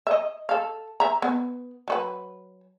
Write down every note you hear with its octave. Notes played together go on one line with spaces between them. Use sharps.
D#5 E5
A4 F5
E5 A#5
B3
F#3 F#4 B4